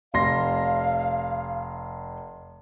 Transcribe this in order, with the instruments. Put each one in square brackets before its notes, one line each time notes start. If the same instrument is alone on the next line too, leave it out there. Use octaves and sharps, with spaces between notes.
[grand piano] F1 C6 A#6 [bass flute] F5